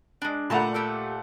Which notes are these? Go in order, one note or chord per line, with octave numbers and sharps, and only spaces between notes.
G#3 D4
A#2 D3 A3 F#5 A5 A#5
G4 A4 A#4